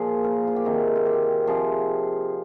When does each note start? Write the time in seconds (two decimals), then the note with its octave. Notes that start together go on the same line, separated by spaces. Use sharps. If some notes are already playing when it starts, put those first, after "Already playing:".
Already playing: A#2 F3 G#4
0.24 A#4
0.47 F4
0.56 G4
0.65 C3 D#3 G#4
0.96 F4
1.06 G4
1.47 C3 F3 G#4